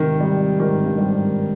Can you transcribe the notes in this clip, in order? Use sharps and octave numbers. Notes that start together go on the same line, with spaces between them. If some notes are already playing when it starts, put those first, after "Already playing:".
Already playing: G#2 C3 D#3
G3
G#2 D#3
G2
G#2 G3